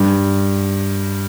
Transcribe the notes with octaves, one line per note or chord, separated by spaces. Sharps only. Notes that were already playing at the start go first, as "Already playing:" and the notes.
Already playing: G2